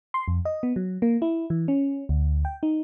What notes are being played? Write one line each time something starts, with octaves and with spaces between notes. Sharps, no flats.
C6
F2
D#5
B3
F#3
A#3
E4
E3
C#4
D2
G5
D#4